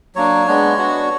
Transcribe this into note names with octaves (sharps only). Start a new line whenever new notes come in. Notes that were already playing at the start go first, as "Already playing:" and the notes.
F#3 A#3 D4 C#5
G#3 B3 D4
B3 D4 F#4